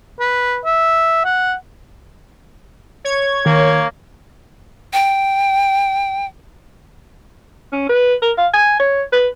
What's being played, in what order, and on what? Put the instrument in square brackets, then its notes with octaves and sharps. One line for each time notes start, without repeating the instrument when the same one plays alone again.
[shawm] B4
E5
F#5
[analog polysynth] C#5 G#6
[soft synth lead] D#3 [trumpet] A#3
[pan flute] G5
[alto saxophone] C#4
B4
A#4
F5
G#5
C#5
B4